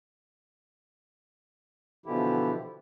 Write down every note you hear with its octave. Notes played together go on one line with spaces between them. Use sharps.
B2 D3 E3 F3 E4 G4